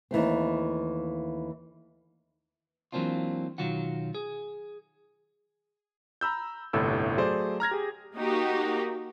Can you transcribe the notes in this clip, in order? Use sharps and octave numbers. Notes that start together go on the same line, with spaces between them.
D#2 E3 A3 C4
E3 F#3 A#3 C4 D4 F4
B1 G#2 D#3 F#3 F4 F#5
G#4
A#5 B5 E6 G6
G1 C2 A2 A4 B5 E6
F#3 A3 G#4 C5 D5
A#5 F6 G#6 A#6
G4 G#4
A#3 D#4 F#4 G4 A#4